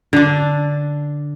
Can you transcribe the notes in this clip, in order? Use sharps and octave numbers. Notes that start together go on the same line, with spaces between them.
D3 D4